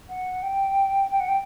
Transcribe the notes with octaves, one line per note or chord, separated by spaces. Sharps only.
F#5
G5
G5
F#5
G5